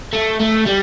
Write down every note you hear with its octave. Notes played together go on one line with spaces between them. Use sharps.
A3
A3
G3